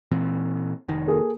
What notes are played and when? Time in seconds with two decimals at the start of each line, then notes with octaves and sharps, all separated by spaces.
0.11 A#2 E3 C4
0.88 F1 D#3
1.07 A#3 G#4 A4